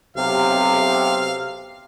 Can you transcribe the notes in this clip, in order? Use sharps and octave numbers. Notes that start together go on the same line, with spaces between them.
B1 C3 F5